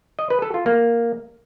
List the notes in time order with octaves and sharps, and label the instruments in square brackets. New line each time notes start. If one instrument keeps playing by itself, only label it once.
[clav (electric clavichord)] D#5
B4
A4
F4
A#3